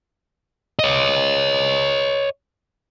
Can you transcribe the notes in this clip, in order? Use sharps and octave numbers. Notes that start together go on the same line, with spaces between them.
C#5 D#5